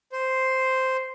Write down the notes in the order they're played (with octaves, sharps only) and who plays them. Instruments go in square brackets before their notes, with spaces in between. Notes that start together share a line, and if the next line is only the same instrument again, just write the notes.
[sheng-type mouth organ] C5